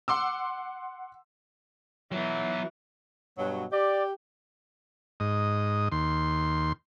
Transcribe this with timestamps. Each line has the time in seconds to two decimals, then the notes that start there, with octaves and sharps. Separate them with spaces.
0.08 F#5 C6 D6 E6
2.12 E3 F#3 B3
3.38 G2 B2 F#3
3.73 G4 D5
5.20 G#2 D#5
5.92 D#2 C6